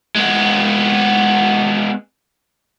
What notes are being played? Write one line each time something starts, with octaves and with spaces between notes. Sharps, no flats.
G#3 B3